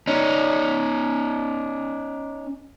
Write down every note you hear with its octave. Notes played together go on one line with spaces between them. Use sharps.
C#4 D#4